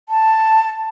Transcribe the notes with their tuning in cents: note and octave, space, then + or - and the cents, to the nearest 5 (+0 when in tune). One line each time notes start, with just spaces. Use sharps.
A5 +5